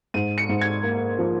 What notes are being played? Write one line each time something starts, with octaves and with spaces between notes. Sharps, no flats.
G#2 D#7
C#7
G#2
G#6
A#3
F3